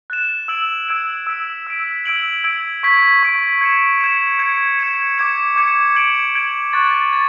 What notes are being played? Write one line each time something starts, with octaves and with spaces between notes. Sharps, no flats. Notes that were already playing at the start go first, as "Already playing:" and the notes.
F#6 A6 E7
E6 G#6 D7 F#7
E6 G#6 D7 F#7
E6 B6 D7
E6 B6 D7
E6 G#6 D7 F#7
E6 G#6 D7 F#7
C#6 G#6 B6 D7
C#6 G#6 B6 D7
G#6 C#7 E7
G#6 C#7 E7
G#6 C#7 E7
G#6 C#7 E7
D6 G#6 C#7 E7
D6 G#6 C#7 E7
G#6 D7 F#7
G#6 D7 F#7
C#6 F#6 A6
A6